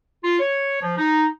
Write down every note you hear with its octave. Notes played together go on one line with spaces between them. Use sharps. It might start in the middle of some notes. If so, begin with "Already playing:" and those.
F4
C#5
F3
D#4